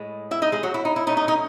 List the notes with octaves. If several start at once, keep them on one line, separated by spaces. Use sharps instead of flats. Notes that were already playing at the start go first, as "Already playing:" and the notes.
Already playing: A2 G#3
E4 E5
D#4 D#5
G#3 G#4
F#3 F#4
E4
D#4
E4
B2 A3 C#4 D#4
D#4
D#4